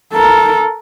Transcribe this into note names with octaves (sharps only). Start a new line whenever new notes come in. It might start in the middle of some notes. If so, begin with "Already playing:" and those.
A4 A#4